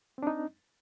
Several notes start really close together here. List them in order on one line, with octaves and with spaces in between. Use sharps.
C4 D4 D#4